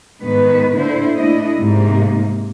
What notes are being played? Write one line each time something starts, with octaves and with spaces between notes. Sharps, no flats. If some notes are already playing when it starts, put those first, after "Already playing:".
G#2 D#3 B3 B4
D3 A#3 E4 C5
A3 D4 E4 D#5
G#2 C3 A#3 D#4